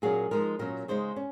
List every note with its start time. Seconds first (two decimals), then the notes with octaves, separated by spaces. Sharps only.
0.02 A#2 F#3 A#3 C#4 G#4
0.31 F3 G#3 D#4 A#4
0.59 A#2 F#3 C#4 A#4
0.88 C#3 G#3 D#4 C5
1.16 C#4